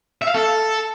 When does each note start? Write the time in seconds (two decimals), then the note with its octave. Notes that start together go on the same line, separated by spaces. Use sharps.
0.22 E5
0.28 F5
0.34 A4